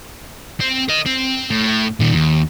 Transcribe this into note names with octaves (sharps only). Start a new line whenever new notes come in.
C4
A#4 D#5
C4
A2
A#2 D#3
D#2